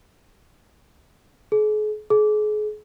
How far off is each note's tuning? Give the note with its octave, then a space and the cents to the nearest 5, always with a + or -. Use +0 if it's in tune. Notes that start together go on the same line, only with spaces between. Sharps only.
G#4 +40
G#4 +35